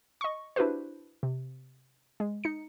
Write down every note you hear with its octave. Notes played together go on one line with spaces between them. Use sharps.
D#5 C#6
D4 E4 F#4 G4 B4 C5
C3
G#3
D#4 C#7